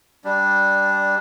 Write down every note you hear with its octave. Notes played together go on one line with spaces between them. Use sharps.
G3 D4